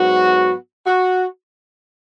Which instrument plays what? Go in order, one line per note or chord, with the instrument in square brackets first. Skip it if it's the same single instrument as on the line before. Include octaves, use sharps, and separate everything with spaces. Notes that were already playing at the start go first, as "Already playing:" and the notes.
Already playing: [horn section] G#2 F#3 B3 F#4
F#4